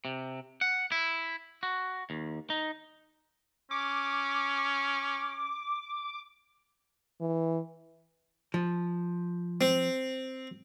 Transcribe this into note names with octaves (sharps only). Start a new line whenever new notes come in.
C3
F#5
E4
F#4
D#2
D#4
C#4 D6
E3
F3
C4